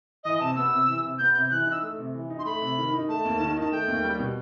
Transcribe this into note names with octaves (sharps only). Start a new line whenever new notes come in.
E3 D#5
C3 A5
B3 E6
C3
E3
C3
B3 G6
C3 G6
E3 F#6
D#4 F#6
E6
A3
C3
E3
D#4
C6
A3 B5
C3
D#3
D#4
A3 A5
D#2
D#3
D#4 A5
A3 G5
D#2
G3
B2